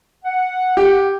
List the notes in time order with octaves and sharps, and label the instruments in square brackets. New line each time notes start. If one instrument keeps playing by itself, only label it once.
[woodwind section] F#5
[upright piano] G4